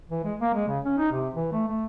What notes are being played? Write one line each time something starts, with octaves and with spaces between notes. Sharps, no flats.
E3
G#3
A#3
G#3
C#3
C#4
D#4
C3
E3
A3
A3